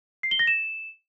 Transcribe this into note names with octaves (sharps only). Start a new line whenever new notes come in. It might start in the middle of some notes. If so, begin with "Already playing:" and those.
C7
G7
A#6
E7